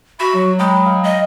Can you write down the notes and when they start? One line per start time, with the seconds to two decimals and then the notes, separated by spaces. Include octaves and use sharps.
0.20 F#4 E5 B5
0.34 F#3
0.59 G#3 D#5 G5 B5
0.86 F5
1.04 D#5